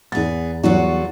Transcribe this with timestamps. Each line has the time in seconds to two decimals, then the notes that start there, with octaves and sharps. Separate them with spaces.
0.12 E2 B3 G#4 A6
0.63 E2 F#3 G3 F4 F#4 C#5